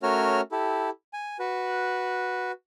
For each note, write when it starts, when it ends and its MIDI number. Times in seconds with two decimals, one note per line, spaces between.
0.03 0.41 57
0.03 0.41 61
0.03 0.41 66
0.03 0.41 70
0.03 0.41 73
0.03 0.41 89
0.52 0.90 64
0.52 0.90 67
0.52 0.90 69
1.13 1.37 80
1.39 2.52 66
1.39 2.52 71